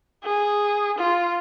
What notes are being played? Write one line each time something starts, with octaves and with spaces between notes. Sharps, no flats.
G#4
F4